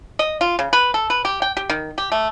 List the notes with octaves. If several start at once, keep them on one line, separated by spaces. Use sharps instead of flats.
D#5
F4
C#3
B4
A4
B4
G4
G5
G4
D#3
G4
A3